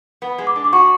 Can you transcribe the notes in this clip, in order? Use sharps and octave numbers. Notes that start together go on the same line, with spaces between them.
B3
G#3
D6
D4
D6
F#4 C#6